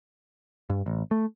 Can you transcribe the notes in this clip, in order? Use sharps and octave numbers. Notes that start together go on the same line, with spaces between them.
G2
A1
A3